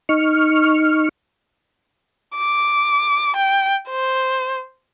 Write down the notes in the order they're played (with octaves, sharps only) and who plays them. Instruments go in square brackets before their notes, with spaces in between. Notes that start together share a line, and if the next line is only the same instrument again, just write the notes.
[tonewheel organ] D#4 C#6 F6
[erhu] D6
G5
C5